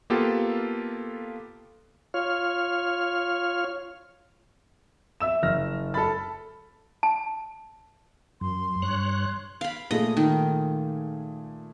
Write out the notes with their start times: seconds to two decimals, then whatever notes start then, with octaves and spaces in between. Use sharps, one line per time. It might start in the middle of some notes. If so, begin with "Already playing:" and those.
0.10 A#3 B3 F4 G4 A4
2.14 F4 C#5 F6
5.20 E5 E6 E7
5.43 F#1 F6 A#6
5.94 A4 B5 A6
7.03 A5
8.41 F#2 C6
8.82 G2 C#5 F#6
9.61 F5 B5
9.91 A#2 A3 G#4 D#5
10.17 D#3